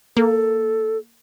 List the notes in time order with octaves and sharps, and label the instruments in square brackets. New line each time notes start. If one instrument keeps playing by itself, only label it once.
[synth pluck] A#3 [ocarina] A4